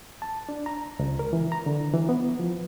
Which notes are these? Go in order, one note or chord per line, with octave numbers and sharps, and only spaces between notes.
A5
D4
A#5
C#2
A#4
E3
A#5
D3
E3
B3
F3